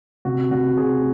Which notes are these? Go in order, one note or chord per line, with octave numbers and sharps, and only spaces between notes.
C3 F#4
C3 F#4
C3 G#4